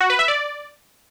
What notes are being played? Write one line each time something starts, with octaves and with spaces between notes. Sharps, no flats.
F#4
B4
E5
D5